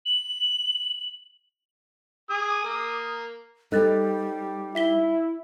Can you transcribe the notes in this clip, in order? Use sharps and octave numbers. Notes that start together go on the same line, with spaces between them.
F#7
G#4 D#6
A#3
G3 C4 D#4 A4 F#6 A6
E4 E5 B6 G7